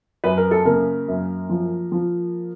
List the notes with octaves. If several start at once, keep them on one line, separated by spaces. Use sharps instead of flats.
F#2 B4
A#4
A4
C#3 A#3 A#4
F#2
F3
F3